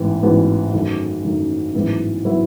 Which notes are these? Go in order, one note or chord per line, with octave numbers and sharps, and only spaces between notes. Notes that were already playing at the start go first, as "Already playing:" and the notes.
Already playing: A1 G#2 E3 B3
A1 G#2 E3 B3 F#4
F#2 D#3 F#3 A3 D#4
F#2 D#3 F#3 A3 D#4
A1 G#2 F#3 B3 E4
F#3 B3 E4